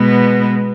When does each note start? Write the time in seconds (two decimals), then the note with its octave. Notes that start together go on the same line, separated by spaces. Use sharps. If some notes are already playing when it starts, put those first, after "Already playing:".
Already playing: B2 G#3 B3